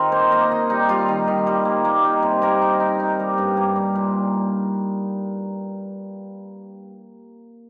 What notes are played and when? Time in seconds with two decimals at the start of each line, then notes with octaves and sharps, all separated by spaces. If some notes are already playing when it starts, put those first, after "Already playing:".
Already playing: D#3 C4 D#4 F4 A#4 F5
0.12 A#3 C5
0.32 A#3 D#5
0.51 D#4 D#5
0.70 G3 D#4
0.89 G3 F4
1.08 D#3
1.27 D#3
1.47 G3
1.65 A#3
1.85 A#3
2.04 D#4
2.23 C3
2.42 A#3 A#4
2.62 D#4
2.80 D#4
3.00 D#4
3.19 G3
3.38 G2
3.57 A#3
3.76 G3
3.95 A#2